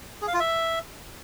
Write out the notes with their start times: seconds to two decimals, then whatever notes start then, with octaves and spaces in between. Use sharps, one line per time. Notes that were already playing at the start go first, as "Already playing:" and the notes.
0.22 G#4
0.28 F5
0.34 F4
0.40 E5